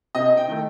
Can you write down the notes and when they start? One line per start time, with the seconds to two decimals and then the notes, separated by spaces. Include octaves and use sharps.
0.15 C3 D#5
0.37 G5
0.48 D#3 A3